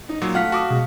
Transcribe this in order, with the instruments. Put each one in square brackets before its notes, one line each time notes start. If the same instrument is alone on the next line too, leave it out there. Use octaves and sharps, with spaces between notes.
[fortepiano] D#4
[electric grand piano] A#2 F#3
[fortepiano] A3 [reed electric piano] F4 [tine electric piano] F5 F6 B6 [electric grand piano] F#5
[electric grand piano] F#4 [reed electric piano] A5 D6 D#6
[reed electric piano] B2 [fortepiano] G#3